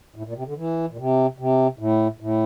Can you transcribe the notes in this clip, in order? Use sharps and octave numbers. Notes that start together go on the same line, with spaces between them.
A2
A#2
C3
D3
E3
A#2
C3
C3
A2
A2